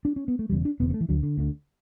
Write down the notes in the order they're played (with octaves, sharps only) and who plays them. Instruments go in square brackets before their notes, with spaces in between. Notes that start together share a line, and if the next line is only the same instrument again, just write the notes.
[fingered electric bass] D4
C#4
B3
A3
E1 E2 C#3 G3
D4
E1 E2 C#3 B3
B3
A3
E3
D2 D3 F#3
D3
D2 D3